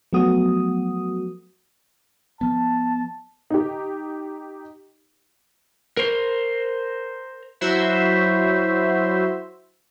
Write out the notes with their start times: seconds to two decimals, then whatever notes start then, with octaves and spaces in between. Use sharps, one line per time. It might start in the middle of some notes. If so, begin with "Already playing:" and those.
0.13 F3 F#3 A3 B3 F#4 D#6
2.41 F3 B3 A5
3.50 D#4 G4
5.97 A#4 C5
7.61 F#3 E4 F#4 C5 E5